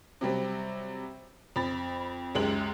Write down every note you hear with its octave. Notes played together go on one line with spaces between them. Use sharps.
C3 F#3 G3 C4
F2 B5 A6
C#2 F#2 G#3 G4 F#7